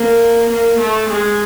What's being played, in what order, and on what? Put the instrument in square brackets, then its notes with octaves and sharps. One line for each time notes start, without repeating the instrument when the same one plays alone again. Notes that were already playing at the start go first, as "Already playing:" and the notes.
Already playing: [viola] A#3
A#3
A3
G#3